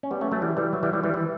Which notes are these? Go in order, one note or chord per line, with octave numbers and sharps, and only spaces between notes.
C#4
G3 B3
A3 C#4
F#3 A3
E3 G3
E3 G3
F#3
E3 G3
E3 G3
E3 G3
E3